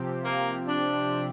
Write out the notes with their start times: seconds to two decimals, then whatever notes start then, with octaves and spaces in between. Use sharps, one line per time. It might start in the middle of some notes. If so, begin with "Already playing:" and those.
Already playing: C3 F3 C4 G4
0.25 A#3
0.67 D4